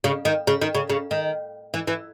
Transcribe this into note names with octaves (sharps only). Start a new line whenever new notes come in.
C#3
D#3
C#3
D#3
C#3
C#3
D#3
E3
E3